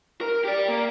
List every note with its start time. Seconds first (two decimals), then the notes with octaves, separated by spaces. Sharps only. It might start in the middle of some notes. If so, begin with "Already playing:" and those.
0.21 A#4
0.45 G4 D5
0.68 A#3